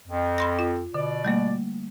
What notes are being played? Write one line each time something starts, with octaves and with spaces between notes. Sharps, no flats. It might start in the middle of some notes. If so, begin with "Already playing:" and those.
F2
B5 C6 A#6
F4
B2 D3 D5
G3 A3 A#3